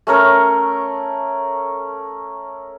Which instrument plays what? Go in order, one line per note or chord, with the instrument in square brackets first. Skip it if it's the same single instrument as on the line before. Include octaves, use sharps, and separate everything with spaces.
[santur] A3 C#4 A#4 C#5